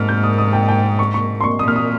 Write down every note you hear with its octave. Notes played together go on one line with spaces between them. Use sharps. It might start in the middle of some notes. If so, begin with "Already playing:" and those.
Already playing: G#2 F6
G6
D#6
D#6
G5
G5
C#6
C#6
C6
C#6
A#2 D#6
F6
D#6